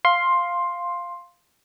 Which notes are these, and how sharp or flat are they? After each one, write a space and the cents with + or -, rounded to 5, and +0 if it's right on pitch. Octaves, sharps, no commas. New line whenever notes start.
F5 +0 C6 +10